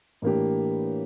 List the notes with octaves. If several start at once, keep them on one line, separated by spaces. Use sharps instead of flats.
A2 E3 A#3 D4 G4